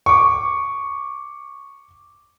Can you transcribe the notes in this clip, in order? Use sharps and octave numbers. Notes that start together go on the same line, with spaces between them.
C#6 D6